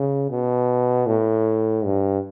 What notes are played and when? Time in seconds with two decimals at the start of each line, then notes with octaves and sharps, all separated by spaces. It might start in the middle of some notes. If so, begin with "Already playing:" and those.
Already playing: C#3
0.30 B2
1.07 A2
1.85 G2